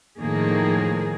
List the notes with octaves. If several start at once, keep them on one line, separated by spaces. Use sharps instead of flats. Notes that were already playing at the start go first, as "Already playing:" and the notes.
A2 D#3 F3 A#3 G#4